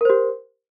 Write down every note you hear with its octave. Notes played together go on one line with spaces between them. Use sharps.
G4 A#4 C5